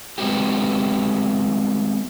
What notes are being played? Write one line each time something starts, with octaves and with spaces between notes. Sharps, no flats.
G3 G#3 B3 C4 F#4 G4